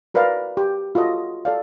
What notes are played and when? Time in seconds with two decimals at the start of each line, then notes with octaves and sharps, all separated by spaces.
0.14 F#4 A#4 B4 D5 F5
0.57 G4
0.95 F4 F#4 A4 D#5
1.45 A4 D5 F5